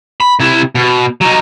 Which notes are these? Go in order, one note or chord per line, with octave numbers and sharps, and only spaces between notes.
B5
C3 E4
B2
F#3 D#4